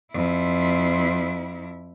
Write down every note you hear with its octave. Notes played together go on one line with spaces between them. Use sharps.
F2 E4